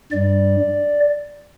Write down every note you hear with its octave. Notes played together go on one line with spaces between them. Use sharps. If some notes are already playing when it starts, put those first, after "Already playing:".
G2 G3 D5